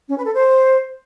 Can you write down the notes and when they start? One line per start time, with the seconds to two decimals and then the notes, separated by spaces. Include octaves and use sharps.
0.09 C#4
0.17 B4
0.26 A4
0.34 C5